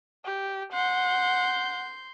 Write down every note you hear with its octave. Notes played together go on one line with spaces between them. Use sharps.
G4
F#5 C6 G6